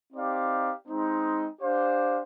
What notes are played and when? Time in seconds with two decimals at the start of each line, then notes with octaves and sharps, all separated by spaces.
0.13 C4 D#4 G4 D5 F5
0.88 G#3 C4 D#4
1.61 D4 G4 C5 F5